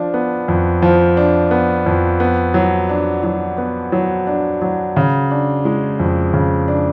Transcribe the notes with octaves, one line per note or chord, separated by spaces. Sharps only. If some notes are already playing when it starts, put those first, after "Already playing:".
Already playing: F3 D4
B3
F2
F3
D4
B3
F2
B3
F#3
D4
F#3
B3
F#3
D4
F#3
C#3
D4
G#3
F2
C#3
D4